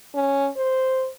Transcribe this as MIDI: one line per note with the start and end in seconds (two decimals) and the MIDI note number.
0.14 0.49 61
0.57 1.08 72